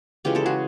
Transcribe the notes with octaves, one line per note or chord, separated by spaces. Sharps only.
C#3 E3 G#3 F4 G4
G4 A4
F#4 G#4